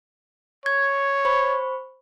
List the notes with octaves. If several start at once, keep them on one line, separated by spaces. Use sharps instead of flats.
C#5 G#6
C5 B5 C#6